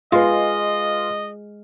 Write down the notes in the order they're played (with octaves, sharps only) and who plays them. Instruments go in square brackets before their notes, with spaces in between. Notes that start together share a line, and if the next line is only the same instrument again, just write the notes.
[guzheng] G#3 [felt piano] F4 B4 [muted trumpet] D#5